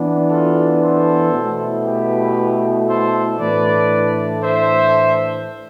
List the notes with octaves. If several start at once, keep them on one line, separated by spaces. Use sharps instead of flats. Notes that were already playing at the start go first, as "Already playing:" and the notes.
Already playing: E3 B3 D4
F4 A4
A4 C5
B2 A3 E4
G4 B4
A4 C5
A2 E3 A3 D4 B4 D5
C5 E5